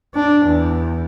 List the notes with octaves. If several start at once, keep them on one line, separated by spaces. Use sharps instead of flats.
D4
E2